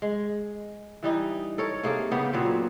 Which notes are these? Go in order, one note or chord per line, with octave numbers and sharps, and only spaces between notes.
G#3
E3 G3 D#4
A4 A#4 C#5
C3 A#3 G#4 A4
C#3 B3 G4
A#2 F#3 B3 C4